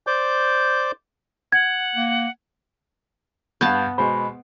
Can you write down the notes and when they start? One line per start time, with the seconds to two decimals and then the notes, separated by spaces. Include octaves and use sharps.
0.07 C5 D5 D6 G6
1.52 F#5 G#6
1.96 A#3
3.61 G2 B3 F5 A5 G6 G#6
3.98 B2 G#3 C5 B5